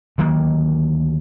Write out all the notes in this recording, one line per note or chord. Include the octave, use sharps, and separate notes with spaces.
D2 D#3 F#3 A#3